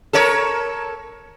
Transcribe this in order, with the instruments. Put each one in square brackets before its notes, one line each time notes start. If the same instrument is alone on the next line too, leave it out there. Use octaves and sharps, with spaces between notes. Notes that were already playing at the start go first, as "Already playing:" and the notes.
[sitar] A4 A#4 C#5